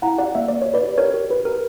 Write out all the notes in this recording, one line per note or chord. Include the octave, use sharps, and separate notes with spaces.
E4 F#5 A#5
G4 D5 F#5
A#3 E5
A#3 D5
G4 C#5
B4 D5
G4
G4 A#4 C#5
G4
G4 B4
G4 A#4